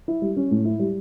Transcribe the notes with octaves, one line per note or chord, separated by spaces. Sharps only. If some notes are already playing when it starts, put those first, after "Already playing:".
E4
G3
C#4
A2
E4
G3